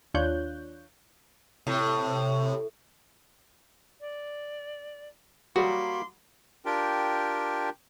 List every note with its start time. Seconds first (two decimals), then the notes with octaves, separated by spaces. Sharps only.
0.14 D#2 D4 F4 C#5 F#6 G6
1.67 A2 C3
4.00 D5
5.56 F#3 G3 A#3 F#4 B5 C6 D6 D#6
6.65 D4 F4 G4 A#4 G5